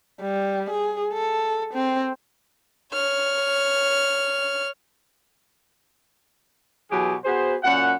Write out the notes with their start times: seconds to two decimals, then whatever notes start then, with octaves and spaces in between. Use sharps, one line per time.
0.21 G3
0.71 G#4
1.13 A4
1.74 C4
2.93 C#5 F6
6.91 B2 E3 F#3 G4 G#4
7.25 B3 F#4 G#4 C5
7.63 F#2 A#2 F#5